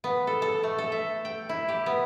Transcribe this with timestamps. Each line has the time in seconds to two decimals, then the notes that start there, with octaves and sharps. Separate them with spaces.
0.04 B3
0.27 A4
0.42 A4
0.63 A3
0.78 A4
0.92 E5
1.25 G5
1.49 E4
1.69 G4
1.86 B3